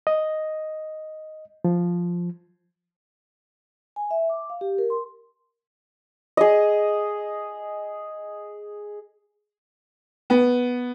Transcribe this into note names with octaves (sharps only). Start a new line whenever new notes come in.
D#5
F3
G#5
E5
D6
F5
G4
A#4
C6
G#4 D#5
B3